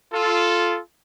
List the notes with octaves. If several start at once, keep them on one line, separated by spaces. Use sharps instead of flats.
F4 A4